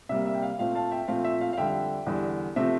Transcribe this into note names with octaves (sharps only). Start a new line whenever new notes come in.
C3 G3 A#3 E5
E5
G5
F5
A#2 A3 C4 F5
F5 A5
E5 G5
A#2 F3 A3 C4 F5
E5
F5
F5
F2 D3 G3 E5 G5
E2 D3 G3
C3 F3 A3 C4 E5